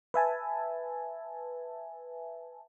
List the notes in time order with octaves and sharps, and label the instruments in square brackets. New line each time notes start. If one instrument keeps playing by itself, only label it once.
[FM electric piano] B4 E5 G#5 A5